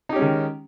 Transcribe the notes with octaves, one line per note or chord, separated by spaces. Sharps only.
D#3 G#3 C#4 D#4 G4